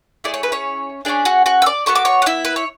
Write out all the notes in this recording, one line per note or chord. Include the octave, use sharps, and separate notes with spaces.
A3 E4 G#4 D5
C#5
B4
C#4 C#5
C#4 D4 E4 G#4 D5
F#4 F#5
F#4 F#5
E6
D5 D6
B3 F#4 A4 C#6
D6
C#5 C#6
F#5
E4 E5
B4
C#5